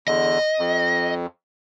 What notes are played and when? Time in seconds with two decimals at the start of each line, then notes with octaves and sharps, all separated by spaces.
0.08 E2 D3 D#5
0.59 F2